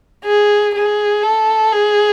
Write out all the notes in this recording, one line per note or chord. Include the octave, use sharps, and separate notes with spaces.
G#4
G#4
A4
G#4